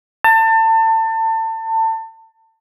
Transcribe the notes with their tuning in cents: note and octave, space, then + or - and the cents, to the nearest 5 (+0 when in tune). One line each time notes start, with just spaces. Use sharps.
A5 +30